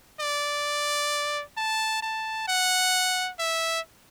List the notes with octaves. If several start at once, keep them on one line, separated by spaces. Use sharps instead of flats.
D5
A5
A5
F#5
E5